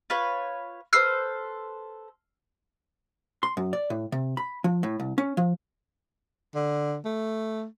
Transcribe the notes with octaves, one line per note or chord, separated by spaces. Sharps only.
F4 B4 C#5
A4 B4 C5 E6 F6 C7
C6
F#2
D5
A2
C3
B5
F3
A2
C2
C#4
F3
D3
A3